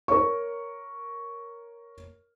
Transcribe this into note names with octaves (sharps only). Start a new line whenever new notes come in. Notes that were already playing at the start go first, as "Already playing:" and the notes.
A#4 C#5 C#6